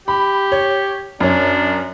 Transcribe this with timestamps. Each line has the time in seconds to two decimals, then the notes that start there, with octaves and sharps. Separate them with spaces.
0.08 G4 B5
0.52 C#5
1.20 F#2 D4 C#5